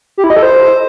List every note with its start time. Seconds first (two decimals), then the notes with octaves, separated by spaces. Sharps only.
0.18 G4
0.24 E4
0.30 D#5
0.36 A4
0.43 C5